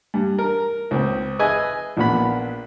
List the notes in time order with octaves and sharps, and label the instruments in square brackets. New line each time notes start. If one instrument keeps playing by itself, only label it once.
[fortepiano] G2
A#4
C#2 C4
G#4 B4 D#5 E5 G#5
A#1 A#2 B3 B5